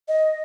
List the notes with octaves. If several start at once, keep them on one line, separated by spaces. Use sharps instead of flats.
D#5